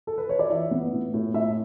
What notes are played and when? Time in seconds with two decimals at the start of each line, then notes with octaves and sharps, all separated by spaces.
0.07 A4
0.18 B4
0.29 C#5
0.39 D5
0.50 E3 E5
0.71 B3
0.93 A2
1.14 A2
1.34 A2 E5